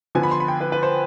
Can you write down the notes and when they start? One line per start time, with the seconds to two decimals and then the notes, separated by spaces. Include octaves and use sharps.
0.15 D3 F3 B3 G#5
0.23 B5
0.31 C6
0.40 B5
0.48 G5
0.61 B4
0.72 B4
0.83 C5